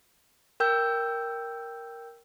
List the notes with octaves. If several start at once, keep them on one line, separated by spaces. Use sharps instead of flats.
A#4 G5 E6 G6